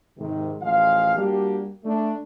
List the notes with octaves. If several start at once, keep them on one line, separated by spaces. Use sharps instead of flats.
G#2 C3 D#3
A1 F3 G#3 F5
G3 A#3 D4 F#4 G4
A3 D4